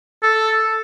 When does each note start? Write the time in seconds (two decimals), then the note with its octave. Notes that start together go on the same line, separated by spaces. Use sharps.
0.23 A4